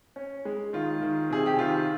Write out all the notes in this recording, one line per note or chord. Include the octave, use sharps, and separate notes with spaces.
C#4
G#3
D#3 F4
D#3
C3 G#4
G4
D#3 F4